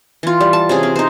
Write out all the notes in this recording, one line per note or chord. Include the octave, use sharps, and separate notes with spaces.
E3 F4
G3
A5
C3 C#4 G#4
C4
D#4 C5